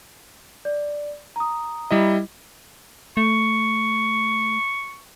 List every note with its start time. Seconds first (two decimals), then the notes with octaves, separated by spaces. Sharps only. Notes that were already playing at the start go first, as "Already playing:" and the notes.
0.65 D5
1.36 A#5 D#6
1.91 G3 E4 D#5
3.17 A3 C#6